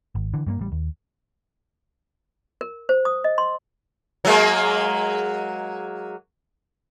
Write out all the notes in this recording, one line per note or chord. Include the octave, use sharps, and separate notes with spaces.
G#1
D3 E3
G2 A3 A#3
A1 G3
D#2
A#4
C5
D#6
D#5
C6
F#3 G#3 A#3